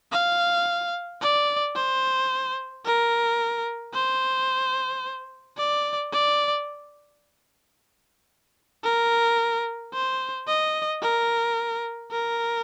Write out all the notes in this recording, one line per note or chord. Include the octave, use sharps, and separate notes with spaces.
F5
D5
C5
A#4
C5
D5
D5
A#4
C5
D#5
A#4
A#4